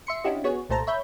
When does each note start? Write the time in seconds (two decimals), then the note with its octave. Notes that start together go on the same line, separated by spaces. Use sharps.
0.07 E5 C6 C#7
0.24 C#4 D4 E4 F#4 G4 D#5
0.44 B3 F#4 G#4 C#5
0.69 C2 A#2 A3 C5 A5 A#5
0.87 C#5 E5 B5 G6